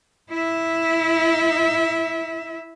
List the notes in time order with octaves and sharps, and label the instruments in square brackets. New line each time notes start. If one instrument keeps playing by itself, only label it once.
[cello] E4 E5